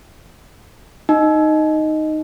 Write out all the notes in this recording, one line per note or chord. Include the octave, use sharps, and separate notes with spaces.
D#4